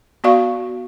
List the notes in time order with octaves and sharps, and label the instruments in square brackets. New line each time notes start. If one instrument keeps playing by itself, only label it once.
[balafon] B3 F#4 D5 F5 C#6